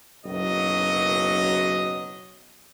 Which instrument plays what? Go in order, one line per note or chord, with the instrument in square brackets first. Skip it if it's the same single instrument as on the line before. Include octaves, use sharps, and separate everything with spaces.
[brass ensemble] F#1 B1 F#2 F#3 D#5